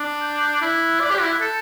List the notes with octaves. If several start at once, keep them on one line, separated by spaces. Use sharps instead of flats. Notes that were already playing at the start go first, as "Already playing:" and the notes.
Already playing: D4
G6
E4 F#6
D5
G4
E4
A4 G6